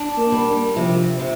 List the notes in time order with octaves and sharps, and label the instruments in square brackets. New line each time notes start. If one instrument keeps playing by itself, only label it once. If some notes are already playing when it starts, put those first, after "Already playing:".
Already playing: [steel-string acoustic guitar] D4
[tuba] A#3
[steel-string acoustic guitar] G3
[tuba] A#3
[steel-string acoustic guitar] C3 [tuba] F3
[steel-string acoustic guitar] C3